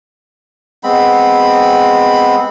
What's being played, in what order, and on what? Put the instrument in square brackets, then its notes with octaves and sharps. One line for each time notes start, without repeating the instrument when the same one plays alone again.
[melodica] G#3 B3 C4 B5